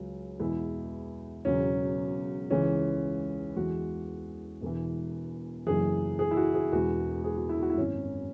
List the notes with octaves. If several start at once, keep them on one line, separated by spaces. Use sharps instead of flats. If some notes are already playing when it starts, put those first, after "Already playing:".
Already playing: C#2 C#3 F#3
E2 B2 G#3 E4
E1 E2 C#3 F#3 C#4
C#2 C#3 E3 G#3 C#4
E2 E3 G#3 F#4
E1 E2 E3
F#1 F#2 E3 G#4
G#4
E4
F#4
G#4
E1 E2 E3 G#3 F#4
G#4
F#4
E4
F#4
E4
G#1 F#2 F#3 C#4